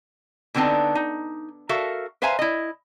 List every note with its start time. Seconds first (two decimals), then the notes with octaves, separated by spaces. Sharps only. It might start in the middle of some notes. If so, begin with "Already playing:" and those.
0.55 B2 D3 B3 C4 D#4 A5
0.95 D#4
1.69 F#4 A4 A#4 E5 F5
2.22 B4 C5 E5 F5 G#5 A#5
2.39 E4 D#5